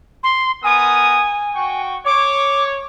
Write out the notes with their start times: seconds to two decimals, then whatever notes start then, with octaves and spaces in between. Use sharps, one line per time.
0.23 C6
0.64 B3 A#4 G#5 D#6
1.55 F#4 G5 C#6
2.06 C#5 D6